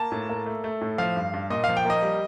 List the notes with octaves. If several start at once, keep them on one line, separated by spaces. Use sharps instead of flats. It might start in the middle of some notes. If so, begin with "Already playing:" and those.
Already playing: A#3 A5
A2
A#3
A3
A3
A2
F3 F5
G2
G2
A#2 D#5
F3 F5
G5
A#3 D#5
G3